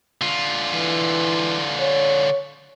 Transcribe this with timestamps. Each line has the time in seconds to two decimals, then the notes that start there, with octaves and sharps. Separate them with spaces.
0.21 D3 F4
0.72 E3
1.80 C#5